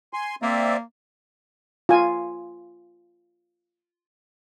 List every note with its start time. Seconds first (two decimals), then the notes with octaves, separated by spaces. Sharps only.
0.13 G#5 C6
0.42 A#3 C4 D5 E5
1.89 F4 G#5